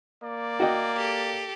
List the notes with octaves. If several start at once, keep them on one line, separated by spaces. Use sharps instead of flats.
A#3 D5
F#4 D#5 G5
G4 A4